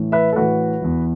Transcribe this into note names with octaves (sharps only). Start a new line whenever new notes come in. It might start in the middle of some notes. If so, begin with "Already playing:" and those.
Already playing: A2 E3
B4 E5
A4
A2 E3 F#4 B4
E2 E3